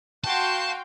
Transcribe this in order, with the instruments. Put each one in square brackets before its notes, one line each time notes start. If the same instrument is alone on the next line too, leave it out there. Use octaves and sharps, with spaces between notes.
[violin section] F#4 F5 C6 [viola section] G5 [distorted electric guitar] A5